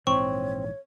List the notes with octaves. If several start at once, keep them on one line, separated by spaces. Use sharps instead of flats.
A#1 G#2 E3 C4 C#5 C#6